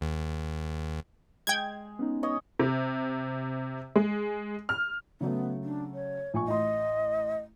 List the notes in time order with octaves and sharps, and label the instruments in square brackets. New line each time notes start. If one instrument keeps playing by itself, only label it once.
[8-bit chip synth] D#2
[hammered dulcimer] G#3 [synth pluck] G5 G#6
[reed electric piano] B3 C#4 D#4
[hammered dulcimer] C#5 D#5 G#5
[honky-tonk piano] C3
G#3
F6
[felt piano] C#3 F#3 A3 [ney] B3
[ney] D4
C#5
[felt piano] A#1 G#5 C#6
[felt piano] A1 C6 [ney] D#5